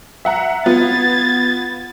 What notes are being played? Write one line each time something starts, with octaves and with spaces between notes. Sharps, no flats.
E5 F#5 A#5
B3 F4 G#6 A6